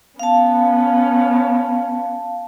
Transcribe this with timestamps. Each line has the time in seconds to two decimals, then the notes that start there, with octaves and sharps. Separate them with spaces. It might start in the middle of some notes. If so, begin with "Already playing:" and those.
0.19 B3 C#4 F5 A5